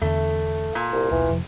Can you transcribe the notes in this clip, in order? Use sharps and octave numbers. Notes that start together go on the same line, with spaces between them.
E2 D3 A3
A#2
C2
D#1 B1 E3
F1 C3 F3